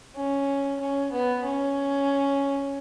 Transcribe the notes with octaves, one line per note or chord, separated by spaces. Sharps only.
C#4
C#4
B3
C#4